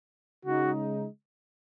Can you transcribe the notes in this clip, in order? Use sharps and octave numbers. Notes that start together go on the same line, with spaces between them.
C#3 G#3 D#4 F#4